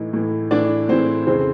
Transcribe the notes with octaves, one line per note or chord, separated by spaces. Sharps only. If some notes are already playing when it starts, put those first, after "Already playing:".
Already playing: A2 E3 D#4
A2 E3
A2 E3 D4 D5
A2 E3 C4 C5
F2 C#3 E3 C4 C5